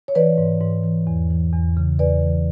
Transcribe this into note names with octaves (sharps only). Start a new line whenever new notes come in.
C#5
E3 B4 D5
G#2
G#2
E3
E2
E3
E2
C#3
E2 B4 D5
E3